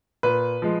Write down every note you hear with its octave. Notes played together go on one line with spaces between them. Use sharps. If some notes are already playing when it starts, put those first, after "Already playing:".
A#2 B4
F3 G#3